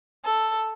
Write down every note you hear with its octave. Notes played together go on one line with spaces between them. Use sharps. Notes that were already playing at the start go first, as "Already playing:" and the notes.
A4